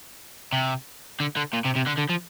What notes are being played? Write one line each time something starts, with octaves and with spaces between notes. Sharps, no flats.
C3
D3
D3
A#2
C3
C3
D3
D3
F3